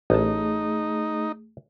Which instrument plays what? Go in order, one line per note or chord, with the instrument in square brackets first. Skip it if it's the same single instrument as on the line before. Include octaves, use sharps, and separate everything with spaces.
[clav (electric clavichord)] A1 A5 [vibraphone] A3 G#4 [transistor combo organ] D#4